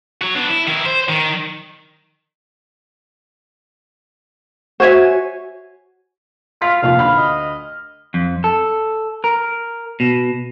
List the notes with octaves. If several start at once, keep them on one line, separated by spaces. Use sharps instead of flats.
F#4 C#5
B3 D4
E4
D#3 E4
C5
D#3
F#4 C5 C#5 E5 G#5
F4 F6 B6
F1 D#2 F4 F5
D2 B5 F6
D#5
F2
A4
A#4
B2